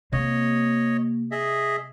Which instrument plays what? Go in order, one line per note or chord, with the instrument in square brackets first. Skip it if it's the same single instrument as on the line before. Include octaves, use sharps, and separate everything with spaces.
[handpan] C3 [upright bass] A#3 [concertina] C#5 D#5
[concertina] G#4 D#5 E5